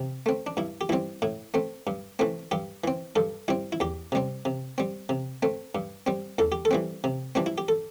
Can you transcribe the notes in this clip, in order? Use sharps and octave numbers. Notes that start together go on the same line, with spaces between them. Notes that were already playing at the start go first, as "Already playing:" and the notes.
Already playing: C3
A3 C4
D4
G2 E4
G4
E3 G3 C4 E4
A2 E4
A3 C4
G2
E3 A3 C4
G2 G4
E3 C4
G2 A4
G3 C4 E4
E4
E2 G4
C3 G3 C4
C3
G3 C4
C3
A3 C4
G2
G3 C4
E2 A4
G4
A4
E3 G3 C4
C3
E3 G3 C4 D4
E4
G4
A4